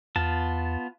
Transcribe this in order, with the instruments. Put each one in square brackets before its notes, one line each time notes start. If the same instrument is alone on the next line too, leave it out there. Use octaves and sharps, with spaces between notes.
[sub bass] E2 [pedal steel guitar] B3 F4 A5